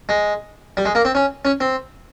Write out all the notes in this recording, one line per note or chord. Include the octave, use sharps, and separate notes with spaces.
G#3
G3
G#3
A#3
C4
C#4
C#4
C4